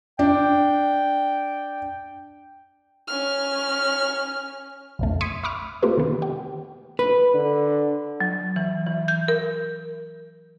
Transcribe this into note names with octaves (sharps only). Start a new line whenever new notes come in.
D4 G5
C#4 F6
B1 F2 A3
C6 D#6 G#6 B6 C#7 D#7
E5 B5 C#6 D6 F6
A3 A#3 C4 F4 G4 B4
C3 D#3 B3
G4
B4
D3
F#3
E3
E3
G6
A#4